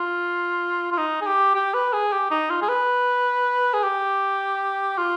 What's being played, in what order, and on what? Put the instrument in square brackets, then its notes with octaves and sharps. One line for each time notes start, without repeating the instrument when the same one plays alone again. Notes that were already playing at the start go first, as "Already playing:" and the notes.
Already playing: [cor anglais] F4
F4
D#4
G#4
G4
G4
B4
G#4
G4
D#4
F4
G#4
B4
G#4
G4
F4